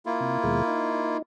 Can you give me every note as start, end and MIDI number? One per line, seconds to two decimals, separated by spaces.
0.06 1.17 58
0.06 1.17 64
0.06 1.17 65
0.20 0.38 48
0.43 0.62 39
0.43 0.62 47
0.43 0.62 56
0.68 1.22 63